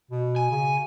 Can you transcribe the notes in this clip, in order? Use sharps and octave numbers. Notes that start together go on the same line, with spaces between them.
B2
G#5
C#3